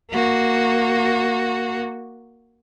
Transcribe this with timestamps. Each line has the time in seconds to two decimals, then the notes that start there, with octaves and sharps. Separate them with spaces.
0.10 A#3 F#4